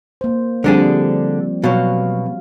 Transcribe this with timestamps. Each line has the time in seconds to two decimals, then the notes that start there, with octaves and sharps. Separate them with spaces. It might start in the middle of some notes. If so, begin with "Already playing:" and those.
0.21 A#3 C5
0.64 D3 F3 G3 C4 D4 G#4
1.64 B2 F#3 F#4 F5